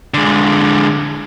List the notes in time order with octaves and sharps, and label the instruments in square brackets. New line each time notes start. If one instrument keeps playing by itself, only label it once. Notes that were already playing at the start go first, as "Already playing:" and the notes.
[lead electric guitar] D3 G#3